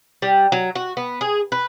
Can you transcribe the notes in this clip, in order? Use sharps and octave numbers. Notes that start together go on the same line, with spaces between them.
G3
F#3
F#4
B3
G#4
B4